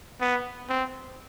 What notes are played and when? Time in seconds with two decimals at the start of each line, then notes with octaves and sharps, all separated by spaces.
0.21 B3
0.69 C4